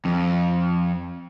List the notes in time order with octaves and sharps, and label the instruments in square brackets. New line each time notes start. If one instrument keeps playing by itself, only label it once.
[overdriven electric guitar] F2